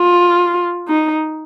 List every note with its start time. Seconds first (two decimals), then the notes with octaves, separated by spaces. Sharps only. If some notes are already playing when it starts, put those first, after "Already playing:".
Already playing: F4
0.88 D#4